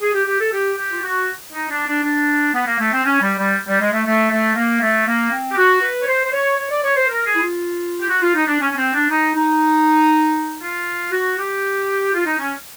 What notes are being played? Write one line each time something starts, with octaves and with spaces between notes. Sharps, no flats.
G#4
G4
G4
A4
G4
G4
F4
F#4
D#4
D4
D4
D4
B3
A#3
A3
C4
C#4
G3
G3
G3
G#3
A3
A3
A3
A#3
A3
A#3
C4
G4
F#4
B4
C#5
C5
C5
C#5
C#5
D5
C#5
C5
A#4
G#4
E4
F4
G4
F#4
F4
D#4
D4
C#4
C#4
C4
D4
D#4
D#4
F4
F#4
G4
F4
D#4
C#4